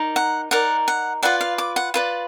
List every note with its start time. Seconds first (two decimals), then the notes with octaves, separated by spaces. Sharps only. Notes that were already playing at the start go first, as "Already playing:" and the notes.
Already playing: D#4 A#4 D5
0.16 F#5
0.51 D#4 A#4 D5 F#5
0.88 F#5
1.23 F4 B4 D5 F#5
1.41 F5
1.58 D6
1.76 F#5
1.94 F4 B4 D5